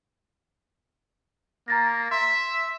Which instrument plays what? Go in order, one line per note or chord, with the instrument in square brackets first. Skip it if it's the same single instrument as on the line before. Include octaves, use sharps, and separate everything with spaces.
[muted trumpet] A#3 [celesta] A#5 A6 A#6
[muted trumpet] E5 [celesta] C6